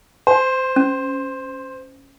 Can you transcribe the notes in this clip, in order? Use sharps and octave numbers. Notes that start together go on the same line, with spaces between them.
C5
C#4